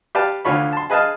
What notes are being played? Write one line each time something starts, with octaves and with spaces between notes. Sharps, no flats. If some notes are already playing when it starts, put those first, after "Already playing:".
G4 B4 D5 F5 G5 A5
D2 D3 F4 C#5 B5
A5 C6
G#4 B4 D#5 F5 A5